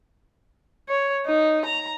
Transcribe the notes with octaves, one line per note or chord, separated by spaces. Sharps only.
C#5
D#4
A#5